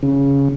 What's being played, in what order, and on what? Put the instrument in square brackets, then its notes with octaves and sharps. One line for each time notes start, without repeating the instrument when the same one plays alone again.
[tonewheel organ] C#3